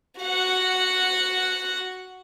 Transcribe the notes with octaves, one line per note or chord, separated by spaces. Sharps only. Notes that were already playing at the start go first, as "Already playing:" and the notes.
F#4 F#5